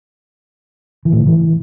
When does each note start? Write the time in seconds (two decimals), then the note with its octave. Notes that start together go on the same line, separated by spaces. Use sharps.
1.05 E3
1.12 A2
1.20 D#3
1.27 E3